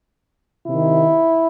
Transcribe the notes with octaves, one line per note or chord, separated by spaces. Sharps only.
C3 D#3 E4